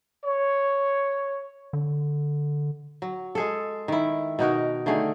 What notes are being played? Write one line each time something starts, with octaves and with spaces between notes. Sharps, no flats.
C#5
D3
F#3
G#3 G#4 A4
D#3 E4
B2 D#4 F#4 A#4
D3 D#3 A3 G#4